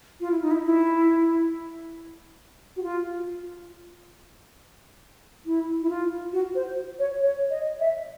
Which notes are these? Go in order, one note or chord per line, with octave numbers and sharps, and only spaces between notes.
F4
E4
D#4
E4
E4
F#4
F4
E4
E4
F4
F#4
C5
C#5
C#5
D#5
E5